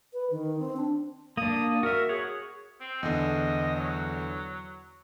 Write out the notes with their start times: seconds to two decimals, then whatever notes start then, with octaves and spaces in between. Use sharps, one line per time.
0.13 B4
0.31 D#3
0.59 C4
0.76 D4
1.37 A#3 D4 D#6
1.83 F#4 A#4 E5
2.09 G#4 C#5 F#5
2.81 C4
3.03 E2 D3 D#5
3.76 F#3